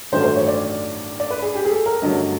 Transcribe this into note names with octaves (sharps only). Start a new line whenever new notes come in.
A1 G2 D#3 F#3 A3 C5
C5
C#5
D5
D5
B4
G#4
G4
G#4
A4
A#4
G2 D3 F#3 A3 C#4 D#5